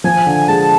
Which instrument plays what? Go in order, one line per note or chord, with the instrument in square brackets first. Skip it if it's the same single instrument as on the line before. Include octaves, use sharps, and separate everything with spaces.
[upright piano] F3 [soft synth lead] G#5
[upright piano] D3
[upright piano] G#3 [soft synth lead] A5